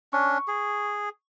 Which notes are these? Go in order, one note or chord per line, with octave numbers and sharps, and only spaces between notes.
C#4 D4 C#6
G#4